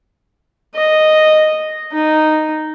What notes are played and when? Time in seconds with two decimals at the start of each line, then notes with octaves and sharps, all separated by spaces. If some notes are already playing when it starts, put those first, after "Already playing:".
0.75 D#5
1.93 D#4